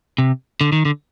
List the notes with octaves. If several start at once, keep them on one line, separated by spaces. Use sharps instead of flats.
C3
D3
D#3
D3